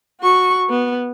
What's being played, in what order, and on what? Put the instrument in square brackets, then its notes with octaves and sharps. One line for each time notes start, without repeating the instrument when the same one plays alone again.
[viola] F#4 C#6
B3